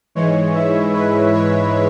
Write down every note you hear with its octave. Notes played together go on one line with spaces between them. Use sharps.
G#2 E3 G#3 C#5
E4 E5
B4
C#5